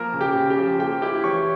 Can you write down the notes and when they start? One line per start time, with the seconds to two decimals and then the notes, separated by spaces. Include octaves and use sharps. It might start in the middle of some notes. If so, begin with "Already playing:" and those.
Already playing: F3 A#3 A#4 A#5
0.13 C#3
0.21 G4 G5
0.35 C#3
0.50 G4 G5
0.58 F3
0.79 A#3 G4 G5
1.02 E4 G4 G5
1.24 E3 C#5 C#6